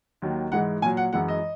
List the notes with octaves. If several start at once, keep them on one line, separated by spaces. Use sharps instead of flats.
D#2 D#3 F#3
G#2 E3 G#3 F#5
A#2 F#3 G#5
F#5
F#2 E3 G#3 F#5
D#5